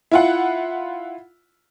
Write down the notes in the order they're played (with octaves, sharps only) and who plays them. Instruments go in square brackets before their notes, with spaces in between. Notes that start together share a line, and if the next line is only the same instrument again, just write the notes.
[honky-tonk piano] E4 F4 F#5